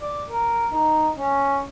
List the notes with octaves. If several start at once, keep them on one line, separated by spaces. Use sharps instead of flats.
D5
A#4
D#4
C#4